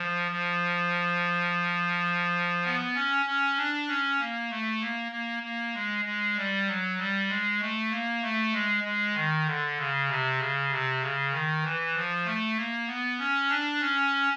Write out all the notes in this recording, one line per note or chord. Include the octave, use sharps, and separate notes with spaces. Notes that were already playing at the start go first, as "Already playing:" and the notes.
Already playing: F3
F3
B3
C#4
C#4
D4
C#4
A#3
A3
A#3
A#3
A#3
G#3
G#3
G3
F#3
G3
G#3
A3
A#3
A3
G#3
G#3
D#3
D3
C#3
C3
C#3
C3
C#3
D#3
E3
F3
A3
A#3
B3
C#4
D4
C#4